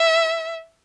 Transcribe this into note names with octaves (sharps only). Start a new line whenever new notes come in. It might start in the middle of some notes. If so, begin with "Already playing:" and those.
Already playing: E5